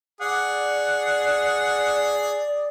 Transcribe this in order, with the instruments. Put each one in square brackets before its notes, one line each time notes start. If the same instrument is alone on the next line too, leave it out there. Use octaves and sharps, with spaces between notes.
[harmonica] G#4 [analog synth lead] D5 [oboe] F#5